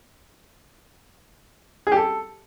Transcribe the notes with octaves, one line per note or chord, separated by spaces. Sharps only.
G#4
G4
A4